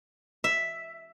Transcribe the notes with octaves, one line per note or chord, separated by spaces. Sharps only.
E5